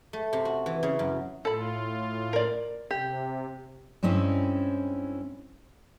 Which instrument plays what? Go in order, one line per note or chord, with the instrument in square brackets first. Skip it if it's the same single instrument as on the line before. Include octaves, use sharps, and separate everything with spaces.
[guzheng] A3
C3
F#4
E3
C#3
F#2
[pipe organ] A2 F4 [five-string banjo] A4 B5
[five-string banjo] A#4 D5
[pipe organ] C3 [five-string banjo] G4
[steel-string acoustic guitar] G2 G#3 C4 C#4 E4